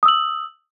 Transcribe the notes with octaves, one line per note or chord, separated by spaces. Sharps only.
D#6 E6 F#7